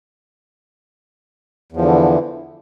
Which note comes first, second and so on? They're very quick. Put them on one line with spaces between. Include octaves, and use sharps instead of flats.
E2 F3 D3 E3